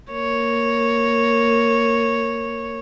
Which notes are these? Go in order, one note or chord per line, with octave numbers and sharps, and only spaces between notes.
A#3 C#5